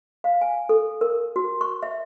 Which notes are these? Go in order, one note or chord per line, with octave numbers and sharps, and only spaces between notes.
F5
G#5
A4
A#4
F#4
C#6
E5